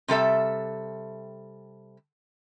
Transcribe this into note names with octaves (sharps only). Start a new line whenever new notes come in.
C3 G3 A4 E5